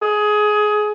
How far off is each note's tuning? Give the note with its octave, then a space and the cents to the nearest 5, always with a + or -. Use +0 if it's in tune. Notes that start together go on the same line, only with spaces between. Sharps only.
G#4 +20